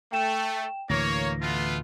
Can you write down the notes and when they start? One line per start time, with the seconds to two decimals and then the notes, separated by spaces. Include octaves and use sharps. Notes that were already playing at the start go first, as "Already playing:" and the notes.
0.12 A3 G5 E7
0.89 D2 A2 E3 A#3 C#5 A#6
1.41 A3 B3 F4